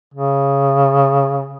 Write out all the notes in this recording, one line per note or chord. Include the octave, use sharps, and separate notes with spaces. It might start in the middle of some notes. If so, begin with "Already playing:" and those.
C#3